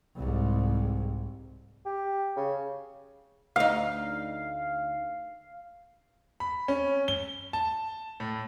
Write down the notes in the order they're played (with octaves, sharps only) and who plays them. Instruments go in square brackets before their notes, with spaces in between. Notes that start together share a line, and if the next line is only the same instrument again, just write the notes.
[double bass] C2 G#2
[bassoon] G4
C#3
[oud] D2 D#4 [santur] F5
[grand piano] B5
C#4
G7
A5
A2